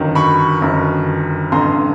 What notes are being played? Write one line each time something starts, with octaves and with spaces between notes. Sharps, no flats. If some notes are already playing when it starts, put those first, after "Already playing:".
Already playing: G1 F#2 D#3
B5 C#6
G1 F#2 D#3
A1 G2 D3 A#5 C6